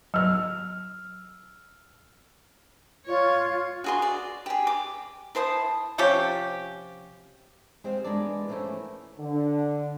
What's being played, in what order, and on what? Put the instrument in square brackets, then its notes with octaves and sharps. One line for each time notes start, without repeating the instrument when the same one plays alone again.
[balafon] F#3 [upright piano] E6 F6
[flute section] F4 [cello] C#5
[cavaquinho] F#4 G#4 C6
D5
G4 G#4
D6
E4 C5 A5 D#6
[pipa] C3 F3 C#4 G4
[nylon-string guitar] G#3 C4 G4 C5 F5
E3 G#3 B3 D4 A#4 D5
E3 F3 A3 A#3 C#4 E4
[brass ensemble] D3